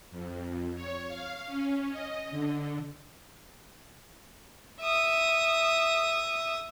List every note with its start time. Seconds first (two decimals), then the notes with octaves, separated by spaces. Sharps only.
0.11 F2
0.75 C#5
1.09 F5
1.47 C#4
1.90 D#5
2.31 D3
4.81 E5 D#6